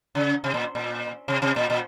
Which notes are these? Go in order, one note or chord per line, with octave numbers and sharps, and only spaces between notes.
C#3
C3
A#2
A#2
C3
C3
A#2
A#2